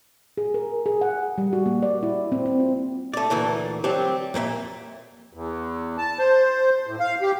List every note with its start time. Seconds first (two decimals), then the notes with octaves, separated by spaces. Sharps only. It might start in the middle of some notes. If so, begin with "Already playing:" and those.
0.38 G#4
0.54 A#4
0.86 G#4
1.01 F#5
1.38 G3
1.53 F#4
1.66 A#3
1.83 D5
2.03 E4
2.32 C4
2.46 C4
2.60 F4
3.14 A3 D5
3.30 D2 A#2 E3 A3
3.84 F#3 G3 C4 G4
4.34 F2 A#2 B4 E5
5.33 E2
5.98 A5
6.19 C5
6.87 A2
7.00 F5
7.21 G4